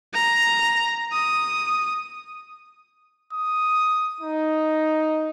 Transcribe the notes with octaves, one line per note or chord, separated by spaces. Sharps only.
A#5
D#6
D#6
D#4